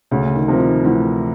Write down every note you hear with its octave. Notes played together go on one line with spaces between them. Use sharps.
D2 C#3
D#3
C3 F3 A#3
D#3
D2 E3